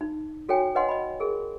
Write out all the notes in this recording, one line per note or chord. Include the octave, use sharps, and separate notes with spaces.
D#4
F#4 A4 C#5 G5 G#5
B4 C#5 D#5 F#5 G#5 C6
D#5 B5
G#4 A#4